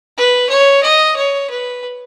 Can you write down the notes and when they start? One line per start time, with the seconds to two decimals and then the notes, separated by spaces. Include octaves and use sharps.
0.17 B4
0.49 C#5
0.83 D#5
1.16 C#5
1.50 B4